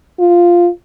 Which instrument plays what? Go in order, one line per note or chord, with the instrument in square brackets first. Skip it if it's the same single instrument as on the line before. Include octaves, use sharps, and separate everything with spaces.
[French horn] F4